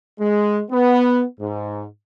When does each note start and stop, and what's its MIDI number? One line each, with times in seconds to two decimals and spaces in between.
0.20 0.60 56
0.71 1.23 59
1.40 1.83 44